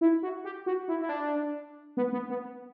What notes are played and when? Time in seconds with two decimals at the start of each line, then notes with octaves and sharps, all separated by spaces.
0.01 E4
0.23 F#4
0.45 G4
0.66 F#4
0.88 E4
1.01 E4
1.09 D4
1.97 B3
2.13 B3
2.30 B3